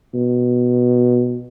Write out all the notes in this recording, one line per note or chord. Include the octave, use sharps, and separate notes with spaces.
B2